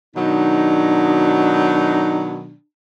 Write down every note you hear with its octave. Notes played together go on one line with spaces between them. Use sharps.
B2 D#3 F#3 D4 D#4